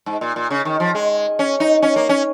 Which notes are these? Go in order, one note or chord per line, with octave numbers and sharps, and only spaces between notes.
G#2
A#2
A#2
C#3
D#3
F3
G#3
C#4
D#4
C#4
A#3
C#4